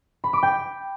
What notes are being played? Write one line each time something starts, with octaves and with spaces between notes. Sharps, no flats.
B5
D6
G5